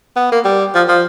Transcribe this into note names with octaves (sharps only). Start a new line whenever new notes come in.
B3
A#3
G3
F3
F3